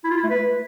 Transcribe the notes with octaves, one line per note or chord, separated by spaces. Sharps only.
E4
F4
E4
A3
B4